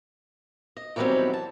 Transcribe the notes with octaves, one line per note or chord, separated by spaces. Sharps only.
D#5
D#3 E3 F#3 G3 B3 C4
A5